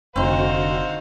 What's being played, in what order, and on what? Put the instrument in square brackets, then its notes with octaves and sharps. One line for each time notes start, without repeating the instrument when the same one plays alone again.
[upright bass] F1 [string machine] D3 F#4 [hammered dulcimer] D#3 C4 [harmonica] C5 F5